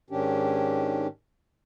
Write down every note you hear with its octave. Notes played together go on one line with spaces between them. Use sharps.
G#2 D#3 C#4 D4 G4